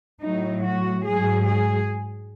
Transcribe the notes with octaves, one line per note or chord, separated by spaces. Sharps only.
A2 F#3 D#4
F#4
G#2 F#3 G#4
G#4